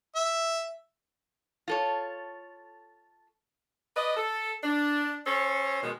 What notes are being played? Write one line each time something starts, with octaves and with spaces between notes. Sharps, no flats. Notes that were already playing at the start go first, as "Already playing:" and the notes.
E5
F4 A4 C#5
B4 D5 D#5
A4
D4
C#4 A4 C5 C#5
B2 D#3 G#3